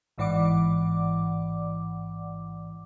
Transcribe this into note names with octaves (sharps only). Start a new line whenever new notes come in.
A1 G#2 E3 D5 F#5 D6